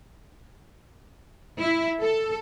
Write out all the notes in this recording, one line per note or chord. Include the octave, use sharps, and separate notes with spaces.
E4
A4